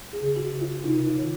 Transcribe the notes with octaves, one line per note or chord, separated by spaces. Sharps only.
G#4
C#3
F#4
C#3
F4
C3 D#4
F4
D#3